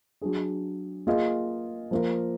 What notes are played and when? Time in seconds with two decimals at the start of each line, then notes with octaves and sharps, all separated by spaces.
0.22 F#3 D4 G#4
1.07 A#3 F4 G#4 D#5
1.91 F3 A#3 F4 A#4